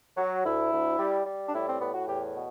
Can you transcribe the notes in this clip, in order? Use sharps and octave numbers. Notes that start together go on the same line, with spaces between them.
F#3
D2 E4
D2
G3
G3
D4
A2 E4
C4
A2 B3
F#4
E2 G4
B2